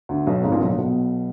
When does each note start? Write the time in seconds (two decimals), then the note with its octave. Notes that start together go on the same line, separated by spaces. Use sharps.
0.09 D2 D3
0.27 B1 B2
0.43 G#1 G#2
0.52 A#1 A#2
0.61 B1 B2
0.69 A#1 A#2
0.78 B1 B2